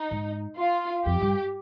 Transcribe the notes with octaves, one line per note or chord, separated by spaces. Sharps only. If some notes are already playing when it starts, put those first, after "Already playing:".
Already playing: D#4
G#2
F4
F2 G4
G2